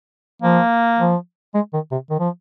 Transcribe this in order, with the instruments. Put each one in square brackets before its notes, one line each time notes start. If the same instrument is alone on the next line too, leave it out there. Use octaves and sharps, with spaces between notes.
[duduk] F3 [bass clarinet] A#3
[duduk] F3
G#3
D#3
C3
D#3
F3